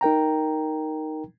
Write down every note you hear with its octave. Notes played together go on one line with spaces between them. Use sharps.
D#4 A#4 G5 A#5